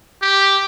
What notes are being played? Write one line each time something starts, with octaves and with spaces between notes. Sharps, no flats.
G4